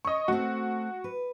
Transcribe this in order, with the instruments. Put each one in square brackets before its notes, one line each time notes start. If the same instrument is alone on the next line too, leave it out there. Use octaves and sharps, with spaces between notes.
[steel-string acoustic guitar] C#5 [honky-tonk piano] D#5 C#6
[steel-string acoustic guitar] A3 C4 [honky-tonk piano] F#4
[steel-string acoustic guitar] B4